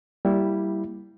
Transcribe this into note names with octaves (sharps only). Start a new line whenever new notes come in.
G3 A#3 E4